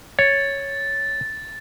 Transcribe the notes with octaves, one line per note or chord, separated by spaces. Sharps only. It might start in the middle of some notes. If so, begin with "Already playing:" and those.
C#5 A6